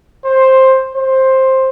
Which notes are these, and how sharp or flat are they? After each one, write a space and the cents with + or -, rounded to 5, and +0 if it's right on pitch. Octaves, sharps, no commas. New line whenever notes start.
C5 +10
C5 +10